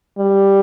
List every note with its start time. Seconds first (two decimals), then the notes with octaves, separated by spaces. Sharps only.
0.18 G3